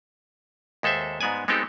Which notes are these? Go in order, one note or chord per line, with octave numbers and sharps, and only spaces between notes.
D#2 G#3 A4 C5 E5
G#2 G#3 B3 D5 G#5
G#3 B3 C4 D#4 G4 A4